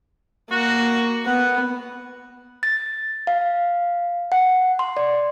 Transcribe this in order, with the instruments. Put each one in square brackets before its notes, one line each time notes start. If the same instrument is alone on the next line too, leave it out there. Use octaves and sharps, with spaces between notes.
[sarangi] A#3 [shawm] F#4
[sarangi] B3 [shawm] F#5
[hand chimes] A6
F5
F#5
C6
D5